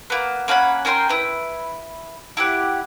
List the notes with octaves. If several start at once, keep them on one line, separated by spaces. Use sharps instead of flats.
A#3 B3
A#3 C#4 F#5 B5
C#4 A#4 G5 C6
E4 B4
E4 G4 F#5